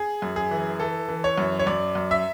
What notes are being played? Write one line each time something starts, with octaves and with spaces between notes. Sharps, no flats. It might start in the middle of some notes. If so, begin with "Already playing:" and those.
Already playing: G#4
F#2
G#4
E3
E3 A4
E3
C#5
F#2
C#5
F#2 D5
F#2
E5